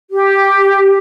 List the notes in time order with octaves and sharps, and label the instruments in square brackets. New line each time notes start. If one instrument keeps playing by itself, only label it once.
[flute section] G4